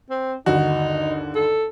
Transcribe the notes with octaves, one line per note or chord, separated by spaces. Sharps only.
C4
G1 D#2 D3 D#4 F#4
A4